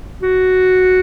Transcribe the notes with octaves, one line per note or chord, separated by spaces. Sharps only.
F#4